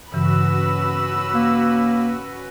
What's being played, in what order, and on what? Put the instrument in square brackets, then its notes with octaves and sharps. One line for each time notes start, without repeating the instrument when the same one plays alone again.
[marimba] G2 C#3 E3 [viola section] C#4 F#4 B4 [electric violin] B5 E6
[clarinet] A#3